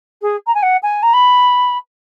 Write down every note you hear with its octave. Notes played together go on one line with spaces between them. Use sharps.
G#4
A#5
G#5
F#5
G#5
A#5
B5